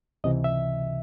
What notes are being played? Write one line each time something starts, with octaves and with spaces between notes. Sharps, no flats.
C#2 C3 E3 D#5
E5